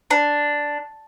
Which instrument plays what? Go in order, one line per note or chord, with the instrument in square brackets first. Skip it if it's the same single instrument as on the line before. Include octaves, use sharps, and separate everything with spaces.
[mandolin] D4